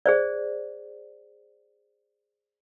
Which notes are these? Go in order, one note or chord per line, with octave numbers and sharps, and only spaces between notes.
G#4 C5 D5